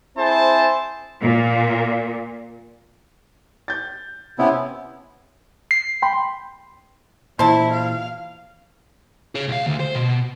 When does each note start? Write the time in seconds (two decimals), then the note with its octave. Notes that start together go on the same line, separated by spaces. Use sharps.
0.17 C4 E4 G#4 C5 A5
1.21 A#2
3.68 G6 A6
4.39 C3 B3 C#4 E4
5.71 C7
6.02 G5 B5 C6
7.39 A#2 E3 E4 C5 A5
7.74 F5
9.35 G#4 C#5
9.48 C2 F5
9.67 D2
9.80 C5
9.95 B2